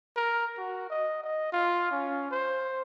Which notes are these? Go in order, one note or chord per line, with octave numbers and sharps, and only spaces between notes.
A#4
F#4
D#5
D#5
F4
C#4
C5